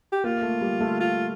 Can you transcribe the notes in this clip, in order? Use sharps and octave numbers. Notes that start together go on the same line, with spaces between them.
G4
A#3 F4
A3
G3
A3
F4